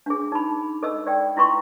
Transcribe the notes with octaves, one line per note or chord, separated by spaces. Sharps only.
D4 G#4
D#4 B5
A4 D#5 E6
D5 G5
E4 F4 C6 C#6